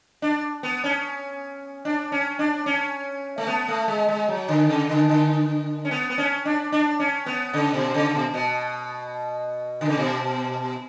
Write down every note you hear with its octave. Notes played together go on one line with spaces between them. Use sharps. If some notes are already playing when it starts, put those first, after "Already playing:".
D4
B3
C#4
D4
C#4
D4
C#4
A3
B3
A3
G#3
G#3
F#3
D3
C#3
D3
D3
C#4
B3
B3
C#4
D4
D4
C#4
B3
C#3
B2
C#3
B2
B2
D3
C#3
B2